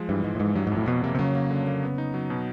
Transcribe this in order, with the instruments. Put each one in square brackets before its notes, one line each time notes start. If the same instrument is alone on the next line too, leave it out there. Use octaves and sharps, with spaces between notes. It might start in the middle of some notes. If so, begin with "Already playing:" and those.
Already playing: [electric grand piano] F3 G#3
[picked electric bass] G2 [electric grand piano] E3
[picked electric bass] G#2 [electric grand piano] G#3
[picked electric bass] A2
[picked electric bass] G#2 [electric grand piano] E3
[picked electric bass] G2 [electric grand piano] F#3
[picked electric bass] G#2
[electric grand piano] F2
[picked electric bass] A2
[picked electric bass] B2 [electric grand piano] F#3
[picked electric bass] C3 [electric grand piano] A#3
[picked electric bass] C3
[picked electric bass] C#3 [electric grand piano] F#3
[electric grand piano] A#3
D3
A#3
B3
D#4
F#3
B2